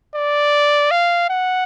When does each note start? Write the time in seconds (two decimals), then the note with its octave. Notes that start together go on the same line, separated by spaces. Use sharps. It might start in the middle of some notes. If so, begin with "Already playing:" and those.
0.15 D5
0.91 F5
1.29 F#5